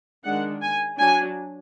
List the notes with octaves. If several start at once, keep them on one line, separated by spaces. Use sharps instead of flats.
D#3 G#3 D4 F#5
G#5
F#3 D4 G#5